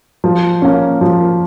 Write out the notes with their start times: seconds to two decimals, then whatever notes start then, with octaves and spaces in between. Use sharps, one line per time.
0.24 F3
0.62 A#3 C#4
1.01 F3